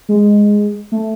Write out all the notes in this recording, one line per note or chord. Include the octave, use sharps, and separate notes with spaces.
G#3
A3